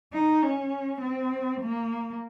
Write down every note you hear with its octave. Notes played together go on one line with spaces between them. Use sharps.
D#4
C#4
C4
A#3